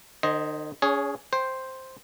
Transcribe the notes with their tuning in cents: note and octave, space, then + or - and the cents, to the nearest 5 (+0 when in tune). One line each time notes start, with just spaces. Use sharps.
D#3 -45 C5 +0 D#5 +0
C#4 +35 G#4 +0 C#5 +0
C5 +0 G5 +0